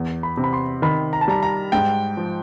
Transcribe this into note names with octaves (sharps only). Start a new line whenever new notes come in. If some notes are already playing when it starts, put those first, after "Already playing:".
Already playing: E2
B5
C3
B5
C6
D#3 B5
A#5
A5
G3 A#5
A#5
G#2 G5
F3